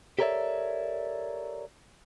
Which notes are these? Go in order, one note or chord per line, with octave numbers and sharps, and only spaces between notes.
G4 A4 A#4 C#5 D5 E5